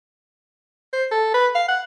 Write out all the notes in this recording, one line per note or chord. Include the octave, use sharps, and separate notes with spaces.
C5
A4
B4
F5
F#5